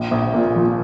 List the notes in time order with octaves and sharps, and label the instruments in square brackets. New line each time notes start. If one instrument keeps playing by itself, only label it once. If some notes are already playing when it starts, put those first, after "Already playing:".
Already playing: [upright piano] A#1
A#1
A#2
F3